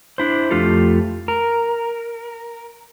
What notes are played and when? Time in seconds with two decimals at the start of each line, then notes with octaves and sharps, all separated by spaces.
0.18 D4 E4 C5
0.51 F2 A3 F4 G4 A4
1.28 A#4